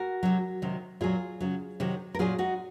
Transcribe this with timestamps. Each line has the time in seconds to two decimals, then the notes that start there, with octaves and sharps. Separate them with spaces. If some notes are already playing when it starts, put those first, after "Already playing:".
Already playing: F#4 A#4
0.23 C3 F#3
0.62 C3 D#3 F#3
1.01 A#2 F#3 F4 G#4
1.41 C#3 F#3
1.80 C3 D#3 F#3
2.15 A#4
2.19 A#2 F#3 F4 G#4
2.38 D#4 F#4